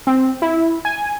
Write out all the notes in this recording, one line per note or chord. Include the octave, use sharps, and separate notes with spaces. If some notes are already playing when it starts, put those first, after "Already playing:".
C4
E4
G#5